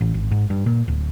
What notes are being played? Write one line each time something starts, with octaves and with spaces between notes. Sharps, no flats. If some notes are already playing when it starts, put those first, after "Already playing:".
A1
G#1
G#2
G2
A#2
D1